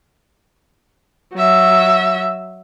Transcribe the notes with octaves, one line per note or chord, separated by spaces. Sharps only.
F#3 E5